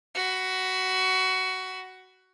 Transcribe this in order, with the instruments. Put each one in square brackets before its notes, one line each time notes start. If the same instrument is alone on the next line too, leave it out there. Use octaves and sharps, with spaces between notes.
[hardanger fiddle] F#4 B5